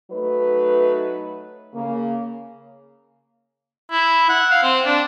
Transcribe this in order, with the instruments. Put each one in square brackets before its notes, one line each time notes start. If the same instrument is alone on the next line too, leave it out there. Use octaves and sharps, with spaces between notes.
[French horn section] F#3 A3 D#4 B4
C#3 A#3
[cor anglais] E4
F#5
F5
C4
D4